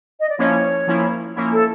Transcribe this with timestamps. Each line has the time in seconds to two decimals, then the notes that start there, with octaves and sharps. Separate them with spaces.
0.20 D#5
0.29 D5
0.38 F3 A#3 C#4 E4 C#5
0.87 F3 A#3 C#4 E4
1.36 F3 A#3 C#4 E4
1.52 A4